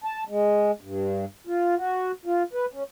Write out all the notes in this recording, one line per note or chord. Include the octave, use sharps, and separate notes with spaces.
A5
G#3
G2
F4
F#4
F4
B4
C#4